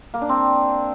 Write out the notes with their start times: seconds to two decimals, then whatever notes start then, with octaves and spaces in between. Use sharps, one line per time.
0.14 A#3
0.21 D4
0.29 C4